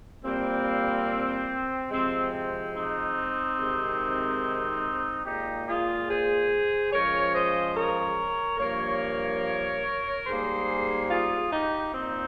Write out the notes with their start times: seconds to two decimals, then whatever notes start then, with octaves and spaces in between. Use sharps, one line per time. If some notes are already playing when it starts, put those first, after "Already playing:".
0.23 A#2 G3 A#3 C4
1.91 C3 F3 G#3 C4
2.33 C4
2.75 C4 D#4
3.58 C3 D#3 G#3
5.25 A#2 G#3 D#4 G4
5.68 F4 G#4
6.09 G#4 C5
6.92 C#3 F3 G#3 A#4 C#5
7.34 C5 D#5
7.76 A#4 C#5
8.59 G2 F3 A#3 A#4 C#5
10.26 G#2 G3 A#3 G#4 C5
11.10 F4 G#4
11.52 D#4 G4
11.94 A#2 C4 D#4